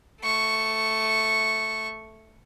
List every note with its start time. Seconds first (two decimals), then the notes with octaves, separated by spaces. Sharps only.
0.21 A3 C#6